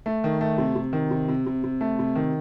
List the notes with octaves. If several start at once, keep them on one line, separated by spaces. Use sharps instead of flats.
A3
D#3
A3
C3
C3
D#3
C3
C3
C3
C3
A3
C3
D#3